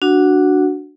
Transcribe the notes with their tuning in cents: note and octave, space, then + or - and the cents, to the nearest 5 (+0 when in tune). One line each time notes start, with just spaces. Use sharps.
D4 +0 F#4 +0 F#5 +0